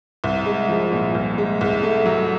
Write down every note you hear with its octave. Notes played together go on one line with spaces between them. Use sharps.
C2
G#3
F3
A#2
C2
G#3
C2
A3
F#3